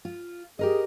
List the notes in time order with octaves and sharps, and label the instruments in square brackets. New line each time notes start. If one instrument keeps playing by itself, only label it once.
[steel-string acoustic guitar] F4
[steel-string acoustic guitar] G4 A#4 D#5 [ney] G#4